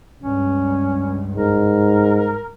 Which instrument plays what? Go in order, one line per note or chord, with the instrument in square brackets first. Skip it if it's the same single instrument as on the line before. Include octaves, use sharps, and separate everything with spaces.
[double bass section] C#2 G2 [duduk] C#4
[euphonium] G#2 [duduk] A#4